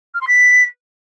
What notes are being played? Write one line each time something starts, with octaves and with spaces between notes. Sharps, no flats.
F6
C6
B6